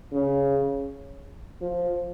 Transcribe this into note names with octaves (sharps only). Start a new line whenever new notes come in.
C#3
F3